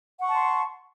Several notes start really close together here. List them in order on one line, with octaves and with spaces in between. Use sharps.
F#5 C#6 A5 C6